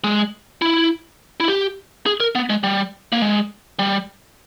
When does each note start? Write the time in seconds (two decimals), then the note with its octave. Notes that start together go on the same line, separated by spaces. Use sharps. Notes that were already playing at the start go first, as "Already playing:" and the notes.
0.04 G#3
0.62 E4
1.40 E4
1.48 G4
2.06 G#4
2.20 A#4
2.35 B3
2.50 G#3
2.63 G3
3.12 A#3
3.22 G#3
3.79 G3